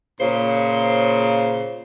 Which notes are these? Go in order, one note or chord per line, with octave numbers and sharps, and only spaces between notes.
A#2 C#3 C5